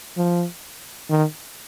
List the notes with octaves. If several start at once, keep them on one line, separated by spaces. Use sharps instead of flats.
F3
D#3